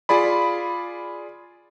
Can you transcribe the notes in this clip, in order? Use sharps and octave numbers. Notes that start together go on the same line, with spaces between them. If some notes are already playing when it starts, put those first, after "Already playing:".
F4 G#4 D5 B5